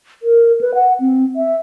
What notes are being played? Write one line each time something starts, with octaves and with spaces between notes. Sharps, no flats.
A#4
B4
F#5
C4
E5